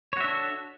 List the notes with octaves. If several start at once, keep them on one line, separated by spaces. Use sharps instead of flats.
D4 F#4 A4 C#5 E5